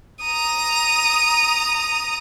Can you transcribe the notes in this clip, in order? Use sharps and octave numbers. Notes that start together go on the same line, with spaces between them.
A#5 D#6